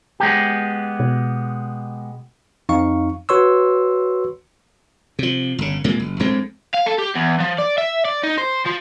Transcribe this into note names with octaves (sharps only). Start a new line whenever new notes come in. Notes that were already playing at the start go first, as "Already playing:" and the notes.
G#3 B3 G4
B2
F2 D#4 F5 C#6
F#4 B4 C#5 C6 C#6 E6
C3 F3
G1 C#3
C2 A#2 G#3 A#3
F#1
A#1 A2 G#3 C4
F5
A4
G4
E2
F3
D5
E5
D5
D#4
C5
F3